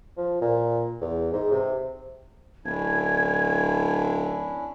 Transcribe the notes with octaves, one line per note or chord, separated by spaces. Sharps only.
F3
A#2
E2
G#2
C3
D1 C#4 D4 E4 G#6